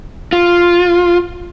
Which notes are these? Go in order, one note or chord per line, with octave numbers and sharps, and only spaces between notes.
F4